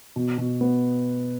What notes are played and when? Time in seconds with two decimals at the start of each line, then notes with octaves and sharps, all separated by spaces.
0.16 B2
0.38 B2
0.61 B3